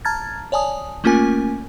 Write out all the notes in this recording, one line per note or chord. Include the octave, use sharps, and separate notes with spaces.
A5 A#5 F6 G#6 A6
C#5 D5 G#5 A5 D#6
A3 A#3 C#4 F4 A#4 G#5